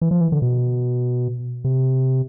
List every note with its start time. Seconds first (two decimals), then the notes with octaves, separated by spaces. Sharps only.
0.01 E3
0.11 F3
0.21 E3
0.32 D3
0.42 B2
1.64 C3